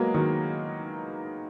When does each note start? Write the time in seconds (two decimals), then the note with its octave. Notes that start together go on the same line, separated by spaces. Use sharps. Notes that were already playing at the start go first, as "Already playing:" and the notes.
Already playing: F#3 G#3 A#3 B3
0.14 D#3 F#3